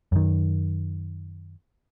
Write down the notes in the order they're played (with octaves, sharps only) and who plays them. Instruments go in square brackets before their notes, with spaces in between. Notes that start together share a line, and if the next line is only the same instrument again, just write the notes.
[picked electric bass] F#2 D#3